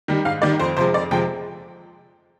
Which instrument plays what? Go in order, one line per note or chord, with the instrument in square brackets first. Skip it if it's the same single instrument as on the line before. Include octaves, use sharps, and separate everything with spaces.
[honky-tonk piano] D#3 G3
G#2 F5
D#3 G3 D5
F2 C5
C3 F3 G#3 C5
F2 D5
C3 F3 G#3 G5